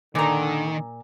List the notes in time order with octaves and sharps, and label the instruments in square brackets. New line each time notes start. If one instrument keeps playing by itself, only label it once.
[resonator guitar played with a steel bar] A#2 A#5 [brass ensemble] D3 [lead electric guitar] D#3